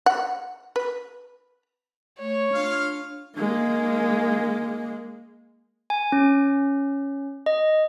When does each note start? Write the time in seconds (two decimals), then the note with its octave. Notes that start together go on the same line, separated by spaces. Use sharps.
0.06 F#5
0.76 B4
2.20 A3 C#5
2.54 D4 F4 F5 F6
3.38 G#3 A#3
5.90 G#5
6.12 C#4
7.46 D#5